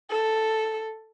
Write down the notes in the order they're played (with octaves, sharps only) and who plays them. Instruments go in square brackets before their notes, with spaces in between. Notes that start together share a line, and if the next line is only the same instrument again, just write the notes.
[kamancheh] A4